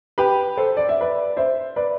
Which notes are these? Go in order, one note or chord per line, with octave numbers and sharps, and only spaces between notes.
G4 B4
A4 C5
D5
E5
B4 D5
C5 E5
B4 D5